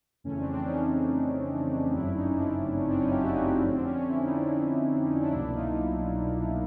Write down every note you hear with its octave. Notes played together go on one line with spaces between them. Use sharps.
F2 C#3 E3 A3 C#4
C4 D4
C4 D4
C#4 D#4
D#4
G1 F#2 C#3 F#3 A3 D4 E4
C#4 D#4
C4 D4
C#4
C4 D4
C#4 D#4
F4 G4
E4 F#4
C#4 D#4
C4 D4
C#4
F2 D3 F3
C4 D4
C#4
C#4
E4
D#4
D4
C#4
C#4
C4 D4
C#4 D#4
C#4 D#4
D4 E4
C2 B2 F#3 A#3 D4 E4
D#4 F4